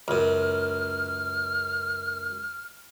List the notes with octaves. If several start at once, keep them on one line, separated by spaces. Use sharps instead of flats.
C#2 F#2 F6